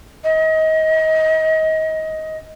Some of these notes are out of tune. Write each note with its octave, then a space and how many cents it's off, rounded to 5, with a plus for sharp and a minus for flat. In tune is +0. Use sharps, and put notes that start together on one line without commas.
D#5 +30